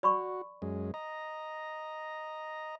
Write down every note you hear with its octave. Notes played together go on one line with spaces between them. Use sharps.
F#4 D5 B5 C#6
F#2 G#3
D#5 A#5